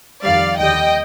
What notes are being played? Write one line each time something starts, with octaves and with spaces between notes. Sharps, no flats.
F2 D#3 G3 D5 F5
D#2 D3 G3 D#5 G5